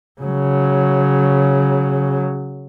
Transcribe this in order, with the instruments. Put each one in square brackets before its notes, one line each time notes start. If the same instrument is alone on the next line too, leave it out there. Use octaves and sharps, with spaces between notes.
[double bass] C#3 F#3